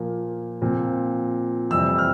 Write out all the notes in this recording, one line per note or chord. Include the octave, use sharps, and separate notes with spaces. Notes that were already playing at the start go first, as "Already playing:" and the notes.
Already playing: A#2 F3 A#3
A#2 F3 C4
F2 C3 E3 G3 C4 E6
F6